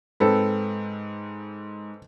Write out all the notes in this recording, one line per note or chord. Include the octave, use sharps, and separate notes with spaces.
G#2 C4 A4 B4